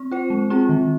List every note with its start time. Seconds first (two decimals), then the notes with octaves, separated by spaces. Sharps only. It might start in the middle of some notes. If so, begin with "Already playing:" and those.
Already playing: C4
0.11 F4 C5
0.30 G#3
0.50 C4 F4 G#4
0.69 D#3